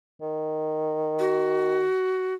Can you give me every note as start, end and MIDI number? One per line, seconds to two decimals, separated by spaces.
0.21 1.86 51
1.20 2.34 66